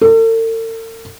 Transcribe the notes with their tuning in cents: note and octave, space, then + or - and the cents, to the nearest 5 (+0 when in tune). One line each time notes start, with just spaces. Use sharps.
A4 +45